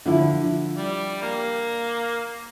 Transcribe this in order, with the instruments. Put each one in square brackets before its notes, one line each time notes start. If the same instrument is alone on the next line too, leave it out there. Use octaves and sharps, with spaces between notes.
[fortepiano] D3 F3 E4
[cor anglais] G3
A#3